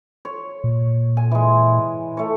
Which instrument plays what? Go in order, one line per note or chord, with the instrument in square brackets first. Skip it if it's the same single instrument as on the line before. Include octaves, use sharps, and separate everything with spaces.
[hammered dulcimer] C#5
[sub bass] A#2
[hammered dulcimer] G#5
E3 G#3
A3 C#5